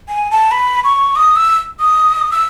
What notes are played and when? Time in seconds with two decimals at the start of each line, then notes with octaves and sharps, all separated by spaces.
0.09 G#5
0.31 A5
0.51 B5
0.84 C#6
1.16 D#6
1.36 E6
1.80 D#6
2.31 E6